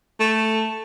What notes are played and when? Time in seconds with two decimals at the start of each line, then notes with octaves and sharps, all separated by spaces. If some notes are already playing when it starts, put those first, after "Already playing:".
0.20 A3